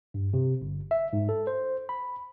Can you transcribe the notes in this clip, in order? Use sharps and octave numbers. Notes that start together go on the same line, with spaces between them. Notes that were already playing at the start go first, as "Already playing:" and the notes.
G2
C3
G1
E5
G#2
A4
C5
B5